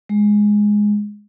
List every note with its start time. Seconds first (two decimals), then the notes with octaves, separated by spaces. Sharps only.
0.09 G#3